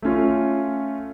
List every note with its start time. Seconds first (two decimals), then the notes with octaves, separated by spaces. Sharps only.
0.02 A3 C#4 F4